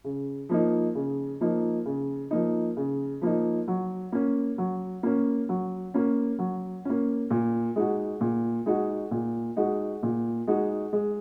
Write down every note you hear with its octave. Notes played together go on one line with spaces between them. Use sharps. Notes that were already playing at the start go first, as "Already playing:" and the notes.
C#3
F3 A#3 D#4
C#3
F3 A#3 D#4
C#3
F3 A#3 D#4
C#3
F3 A#3 D#4
F#3
A#3 C#4
F#3
A#3 C#4
F#3
A#3 C#4
F#3
A#3 C#4
A#2
G#3 D#4 F#4
A#2
G#3 D#4 F#4
A#2
G#3 D#4 F#4
A#2
G#3 D#4 F#4
G#3